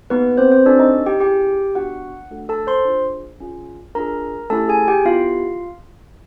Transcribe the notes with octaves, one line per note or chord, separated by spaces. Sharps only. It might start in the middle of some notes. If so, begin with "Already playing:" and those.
A#3 B3 D#4 G4 B4
B4
C4 C5
C4 C5
C#4 D4 F#4 A4 D5
D#4 D#5
G4 G5
C#4 E4 G4 G#4 G5
B3 D4 F#4 F#5
A3 D4 F#4 A4
A4 A5
C5 C6
D4 F4 G#4
C#4 F4 G#4
D4 F4 G#4 A#4 A#5
A3 C#4 E4 G4 A4 A5
G#4 G#5
G4 G5
B3 E4 F4 G4 F5